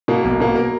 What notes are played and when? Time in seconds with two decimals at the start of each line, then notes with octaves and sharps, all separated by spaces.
0.08 B2 A#3
0.24 B1
0.40 B2 A#3
0.56 A#4